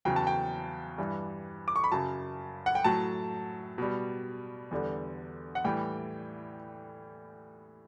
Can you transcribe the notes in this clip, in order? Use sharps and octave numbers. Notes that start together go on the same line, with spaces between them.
E2 C#3 F#3 G5
A5
G5
G2 E3 G3
D6
C#6
B5
F#2 C#3 F#3 A5
F#5
G5
A2 F#3 A5
B2 G3
E2 D3 G3
F#5
A2 E3 G3 G5